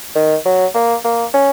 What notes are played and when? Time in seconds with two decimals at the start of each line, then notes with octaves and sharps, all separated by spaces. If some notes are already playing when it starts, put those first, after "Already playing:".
0.16 D#3
0.46 F#3
0.75 A#3
1.05 A#3
1.34 C#4